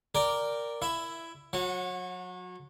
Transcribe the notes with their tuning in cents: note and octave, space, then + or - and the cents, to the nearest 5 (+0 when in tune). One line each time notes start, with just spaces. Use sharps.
A#4 +0 D5 -5 G5 +0
E4 +10 E5 +0
F#3 -30 F#5 +0